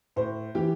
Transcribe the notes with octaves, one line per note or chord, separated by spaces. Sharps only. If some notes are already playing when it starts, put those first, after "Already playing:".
A2 C5
E3 G4